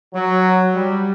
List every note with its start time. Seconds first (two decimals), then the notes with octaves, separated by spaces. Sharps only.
0.14 F#3
0.74 G3